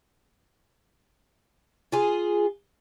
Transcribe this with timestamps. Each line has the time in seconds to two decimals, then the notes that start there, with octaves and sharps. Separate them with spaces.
1.92 F4 G#4